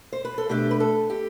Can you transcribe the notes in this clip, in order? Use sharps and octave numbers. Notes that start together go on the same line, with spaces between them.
C5
B4
A4
B2 A3 D4 G4
B4
A4
G4